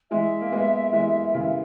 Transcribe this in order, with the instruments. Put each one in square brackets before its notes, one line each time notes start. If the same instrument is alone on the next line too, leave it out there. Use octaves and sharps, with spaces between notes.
[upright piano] E3 G#3 [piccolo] E5
[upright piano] A#3
G#3 B3
E3 G#3
C#3 E3